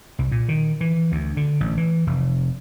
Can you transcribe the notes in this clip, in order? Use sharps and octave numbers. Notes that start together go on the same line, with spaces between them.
C2
A#2
D#3
E3
D2
D3
A1
E3
F1